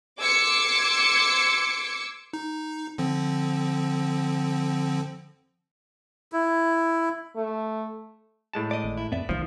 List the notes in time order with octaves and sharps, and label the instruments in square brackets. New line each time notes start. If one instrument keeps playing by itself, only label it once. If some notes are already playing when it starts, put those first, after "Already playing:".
[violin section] C6 D6 E6 G#6 C#7
[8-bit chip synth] D#4
D3 F3 C4
[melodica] E4
[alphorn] A3
[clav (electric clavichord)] A2 G#3 A5
[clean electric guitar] D5 D#5
[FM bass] G#1
[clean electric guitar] E4
[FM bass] F2 [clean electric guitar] B3 D5 E5
[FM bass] B1 [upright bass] D#3 D#4 [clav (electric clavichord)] F3